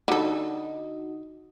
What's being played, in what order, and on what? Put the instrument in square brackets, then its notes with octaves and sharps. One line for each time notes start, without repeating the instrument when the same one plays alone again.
[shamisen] D3 A4 [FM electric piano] D#4 F#4 D#5